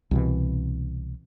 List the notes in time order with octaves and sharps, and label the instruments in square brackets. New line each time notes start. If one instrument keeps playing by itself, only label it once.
[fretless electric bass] C2 B2 E3